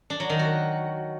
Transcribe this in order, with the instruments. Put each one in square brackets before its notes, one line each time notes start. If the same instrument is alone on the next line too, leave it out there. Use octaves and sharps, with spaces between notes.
[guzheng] D4
F#3
D#3
F#4